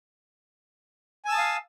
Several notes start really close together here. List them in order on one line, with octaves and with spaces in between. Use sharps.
G#5 E6 A5 D#6 F5